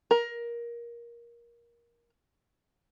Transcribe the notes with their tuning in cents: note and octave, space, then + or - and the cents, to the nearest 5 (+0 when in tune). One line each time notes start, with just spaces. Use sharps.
A#4 +20